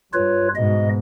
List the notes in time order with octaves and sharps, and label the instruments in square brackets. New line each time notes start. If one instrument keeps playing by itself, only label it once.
[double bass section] G2 [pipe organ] F4 B4 C#5
[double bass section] G#2 B2 [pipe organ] D#5